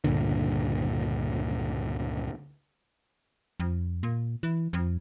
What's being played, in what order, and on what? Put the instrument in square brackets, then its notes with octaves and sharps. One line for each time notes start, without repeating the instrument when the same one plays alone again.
[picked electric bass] C#2 G2 A#2 D3
[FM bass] F2
A#2
E3
F2